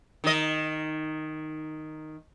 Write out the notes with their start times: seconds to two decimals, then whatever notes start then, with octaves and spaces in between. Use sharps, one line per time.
0.24 D#3 D#5